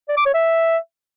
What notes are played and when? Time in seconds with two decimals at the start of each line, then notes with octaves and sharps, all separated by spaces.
0.09 D5
0.17 D6
0.26 C#5
0.34 E5